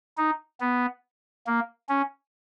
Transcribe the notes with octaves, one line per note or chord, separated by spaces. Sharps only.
D#4
B3
A#3
C#4